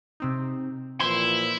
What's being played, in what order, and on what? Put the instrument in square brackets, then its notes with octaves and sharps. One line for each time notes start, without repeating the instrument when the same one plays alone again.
[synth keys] C3 C4 D#4
[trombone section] A#2 E3 F3 [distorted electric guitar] E4 [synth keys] C5 [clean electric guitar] C6